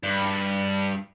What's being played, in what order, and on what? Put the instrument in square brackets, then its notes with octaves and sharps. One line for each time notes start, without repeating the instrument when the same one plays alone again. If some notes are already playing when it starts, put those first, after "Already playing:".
[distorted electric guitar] G2